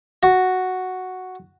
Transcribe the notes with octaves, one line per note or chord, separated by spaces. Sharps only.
F#4